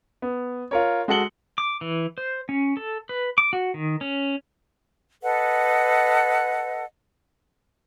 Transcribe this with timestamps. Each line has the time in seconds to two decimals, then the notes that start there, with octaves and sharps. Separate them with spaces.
0.22 B3
0.71 F4 A#4 C#5
1.08 G#3 F#4 A4 C#7 F#7 G7
1.58 D6
1.81 E3
2.18 C5
2.49 C#4
2.77 A4
3.09 B4
3.38 D6
3.53 F#4
3.74 D#3
4.01 C#4
5.22 A4 B4 D#5 F#5